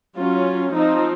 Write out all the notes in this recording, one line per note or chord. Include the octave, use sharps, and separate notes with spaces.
F#3 C#4 F4
F3 C4 D#4